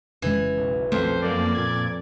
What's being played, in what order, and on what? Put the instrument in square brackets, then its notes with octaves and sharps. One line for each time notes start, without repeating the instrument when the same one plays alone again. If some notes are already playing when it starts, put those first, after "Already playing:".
[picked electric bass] F1 C#3 G#3 [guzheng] E3
[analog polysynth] B1
[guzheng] F2 [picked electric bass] A3 [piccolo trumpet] C5
[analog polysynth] F#2 A#3 [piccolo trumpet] D5
[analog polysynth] A#2 G#6